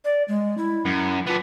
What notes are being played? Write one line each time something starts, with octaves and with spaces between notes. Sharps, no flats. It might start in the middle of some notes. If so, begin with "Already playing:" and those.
D5
G#3
E4
F#2
B3 D4 F4